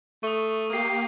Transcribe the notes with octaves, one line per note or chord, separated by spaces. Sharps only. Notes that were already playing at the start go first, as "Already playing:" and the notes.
A3 C#6 D#6
A#3 G4 D#6 C7